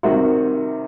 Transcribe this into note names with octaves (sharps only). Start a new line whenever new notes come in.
C3 D#3 G3 F#4